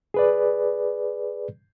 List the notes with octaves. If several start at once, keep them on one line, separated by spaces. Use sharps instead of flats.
G#4 B4 D5